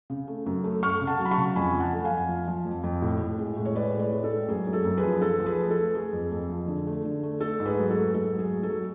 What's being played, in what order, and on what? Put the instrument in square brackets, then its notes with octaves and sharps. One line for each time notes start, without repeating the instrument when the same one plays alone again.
[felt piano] C#3
A3
F#2
A3
A3 C#6 F6
C#3
F#5 A5
F#3
B5
A5 C#6
C#3
F2 G#5 B5
F3
F#5 A5
A3
F5 G#5
F2
F3
F3
F2
F2
A2
A2
G#3
A2
C#5
G#3 B4 D5
A2 C#5
B4 D5
G#3
A4
G#3
F#2 G#4
F#2
A4
F#2
G#4 B4
F3
F3 A4
F3
G#4 B4
A3
A4
A3
A3 G#4
F2
F2
F3
D3
A3
D3
A3
A3 A4
G#2
G#4 B4
F#3
A4
A3
G#2 A4
F#3
G#4
A3
A4
F#3